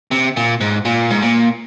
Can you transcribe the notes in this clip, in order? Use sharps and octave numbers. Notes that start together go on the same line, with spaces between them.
C3
A#2
G#2
A#2
G#2
A#2